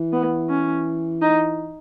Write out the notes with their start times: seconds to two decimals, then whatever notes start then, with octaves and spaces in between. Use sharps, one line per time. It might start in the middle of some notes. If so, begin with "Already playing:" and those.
Already playing: E3
0.12 B3
0.49 C#4
1.21 D#4